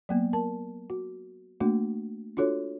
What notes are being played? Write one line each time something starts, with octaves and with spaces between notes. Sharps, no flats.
F#3 A#3 B3
A#4 A5
F#4
A3 A#3 D4 F#4
D4 F4 F#4 A4 C#5